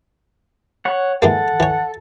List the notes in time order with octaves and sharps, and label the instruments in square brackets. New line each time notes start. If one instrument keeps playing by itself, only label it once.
[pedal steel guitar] C#5 F#5
[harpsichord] E3 G#3 A#3 [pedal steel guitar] A4 [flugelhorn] F#5
[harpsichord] E3 C#5